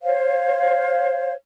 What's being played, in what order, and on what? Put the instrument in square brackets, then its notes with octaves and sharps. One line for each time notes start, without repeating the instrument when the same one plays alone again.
[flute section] C5 C#5 F5